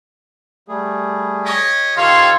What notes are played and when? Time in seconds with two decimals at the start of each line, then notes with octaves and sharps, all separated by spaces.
0.68 G3 A3 G#4
1.45 G4 C#5 D#5
1.97 D#3 F4 G4 A4 C#5 F5 C6